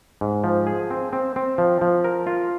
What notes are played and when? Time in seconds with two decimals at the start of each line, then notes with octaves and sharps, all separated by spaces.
0.21 G#2
0.44 F3
0.67 G#4
0.91 C4
1.13 C4
1.36 C4
1.58 F3
1.81 F3
2.04 A#4
2.27 F4